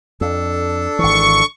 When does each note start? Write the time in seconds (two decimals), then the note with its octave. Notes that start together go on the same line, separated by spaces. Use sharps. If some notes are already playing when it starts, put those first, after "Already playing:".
0.21 F2 D4 A4
0.99 G#1 E3 C#6